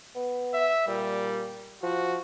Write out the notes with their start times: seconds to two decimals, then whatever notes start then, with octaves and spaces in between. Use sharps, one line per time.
0.15 B3
0.54 E5
0.87 A#2 G3
1.83 F3 F#4